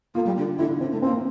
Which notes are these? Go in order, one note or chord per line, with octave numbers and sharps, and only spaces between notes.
A#3 F4
G3
D3
D3 E4
D3 C4
A3
A#3 C4